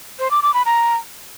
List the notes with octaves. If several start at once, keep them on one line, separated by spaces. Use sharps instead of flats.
C5
D6
D6
B5
A#5